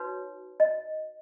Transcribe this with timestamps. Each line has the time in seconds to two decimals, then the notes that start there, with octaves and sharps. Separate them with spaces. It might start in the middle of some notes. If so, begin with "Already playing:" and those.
Already playing: D#4 F#4 B4 C#5
0.60 D#5